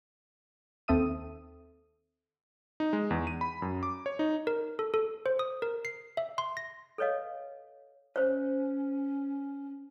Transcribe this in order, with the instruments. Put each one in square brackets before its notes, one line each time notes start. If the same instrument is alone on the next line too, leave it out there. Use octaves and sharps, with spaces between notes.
[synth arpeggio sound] D#2 C4 A4 E5 D#6 D#7
[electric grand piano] D#4
G#3
E2
D#7
B5
F#2
D6
C#5
D#4
[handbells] A#4
A4
A4
C5
D#6
A#4
C7
E5
C6
A#6
[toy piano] A4 B4 C#5 D#5 F5
[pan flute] C#4 [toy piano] C5 C#5